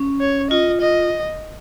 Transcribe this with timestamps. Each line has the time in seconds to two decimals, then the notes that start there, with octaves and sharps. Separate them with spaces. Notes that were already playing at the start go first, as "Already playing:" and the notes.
Already playing: C#4
0.21 C#5
0.50 F4 D#5
0.81 D#5